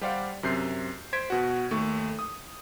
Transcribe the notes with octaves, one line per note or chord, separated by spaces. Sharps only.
G3 G4 C5 D5 F5 F#5
F#2 C3 G6 C7
C5 G#6 B6 D7
B2 F#4
D#2 A3 C#6
D#6